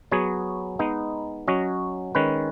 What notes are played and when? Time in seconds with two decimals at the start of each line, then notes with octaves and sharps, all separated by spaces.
0.11 F#3 B3 G#4 C#5
0.79 G#3 B3 D#4
1.47 F#3 C#4 F#4 D#5
2.15 D#3 G#3 C#4 B4